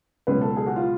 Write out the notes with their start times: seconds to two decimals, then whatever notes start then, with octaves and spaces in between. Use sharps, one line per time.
0.27 C#2 B2 F#3 B4
0.42 A4
0.56 G#4
0.67 F#4
0.76 F4